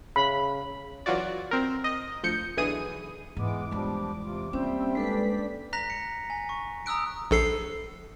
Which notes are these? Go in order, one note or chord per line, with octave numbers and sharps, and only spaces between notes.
C#3 B5
E3 F#3 F4 F#4 D5
C4 A#4
D#5
D2 F3 G6 C#7
B1 D3 E3 G#4 D#6 D#7
E2 G#2 E3 G#3 B3 D6
F3 G3 G#3 B3 D4
C3 F4
G3 A#3 C4 C#4 C5 E5 G5
G#3 D4 A4 B4 D5 B6
A#5 F#6 A#6 B6 F7
C#7
G#5
C#6
A#5 D#6 E6 F#6 D7
A#1 A4 C7